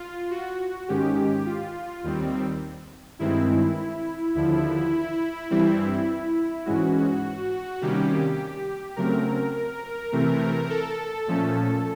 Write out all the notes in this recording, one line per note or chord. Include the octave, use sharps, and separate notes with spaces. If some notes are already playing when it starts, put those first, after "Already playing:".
Already playing: F4
F#4
G#2 D#3 G#3 C#4 G4
F4
D#2 D#3 G3 C4
G2 D#3 G#3 C4 E4
D#2 D3 F3 E4
G2 E3 G3 C4 E4
G#2 E3 G#3 C#4 F#4
C3 D#3 G3 A#3 C#4 G4
C#3 F#3 A3 C4 A#4
C3 E3 A3 C4
A4
A#2 F3 A3 C#4